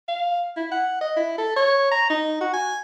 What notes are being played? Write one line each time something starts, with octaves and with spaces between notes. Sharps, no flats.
F5
E4
F#5
D#5
E4
A4
C#5
A#5
D#4
F#4
G#5